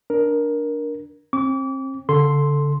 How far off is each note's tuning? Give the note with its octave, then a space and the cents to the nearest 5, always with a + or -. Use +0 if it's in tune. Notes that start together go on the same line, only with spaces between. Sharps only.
D4 +0 A#4 +15
C4 +35 D6 -35
D3 -45 A4 +0 C6 +0